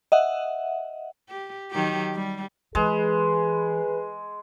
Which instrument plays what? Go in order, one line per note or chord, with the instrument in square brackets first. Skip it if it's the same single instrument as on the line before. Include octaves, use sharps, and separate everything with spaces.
[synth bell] D#5 E5 F#5
[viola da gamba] G4
D#3 F#3 G4
G3
[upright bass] E3 [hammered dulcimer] G#3 [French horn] G#4 [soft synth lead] B4